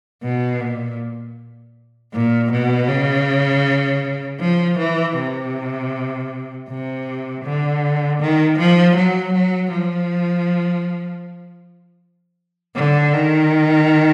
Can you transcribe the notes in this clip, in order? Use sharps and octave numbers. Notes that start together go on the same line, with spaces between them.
B2
A#2
A#2
B2
C#3
F3
E3
C3
C3
D3
D#3
F3
F#3
F#3
F3
D3
D#3